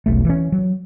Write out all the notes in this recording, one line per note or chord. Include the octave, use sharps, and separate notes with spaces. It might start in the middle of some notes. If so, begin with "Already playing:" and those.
E1 B1 A3
E3 C#4
F#3